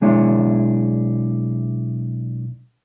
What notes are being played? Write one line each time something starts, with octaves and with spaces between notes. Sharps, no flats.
B1 G#3 D4 E4 C#5